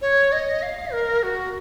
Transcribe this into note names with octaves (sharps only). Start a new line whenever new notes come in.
C#5
D#5
F5
A#4
F#4